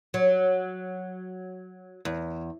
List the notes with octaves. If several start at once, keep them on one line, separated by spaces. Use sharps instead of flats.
F#3
E2